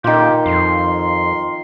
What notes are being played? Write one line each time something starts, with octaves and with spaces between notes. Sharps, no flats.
A#2 D#3 F4 G4
F2 C6